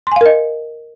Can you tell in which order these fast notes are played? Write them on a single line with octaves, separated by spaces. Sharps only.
C6 G#5 F5 A#4 D#5